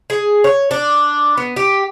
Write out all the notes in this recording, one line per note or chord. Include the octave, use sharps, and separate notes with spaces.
G#4
C#5
D4
B3
G4